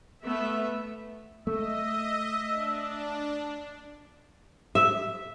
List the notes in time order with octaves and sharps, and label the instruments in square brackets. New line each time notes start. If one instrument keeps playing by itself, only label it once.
[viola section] A3 B3 E5
[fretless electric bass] A3 [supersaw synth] D#5 [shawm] E5
[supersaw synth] D4
[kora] E5